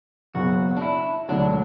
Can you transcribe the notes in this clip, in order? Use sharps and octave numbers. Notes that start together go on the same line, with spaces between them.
F#1 F#2 C#3 F#3 B3 F#4
D4
E4
E1 D2 D3 F#3 D4